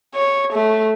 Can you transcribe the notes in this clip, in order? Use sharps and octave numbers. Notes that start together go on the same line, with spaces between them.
C#5
A3